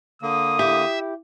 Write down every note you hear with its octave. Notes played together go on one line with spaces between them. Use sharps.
D3 A#3 D#6
E4 G4 E5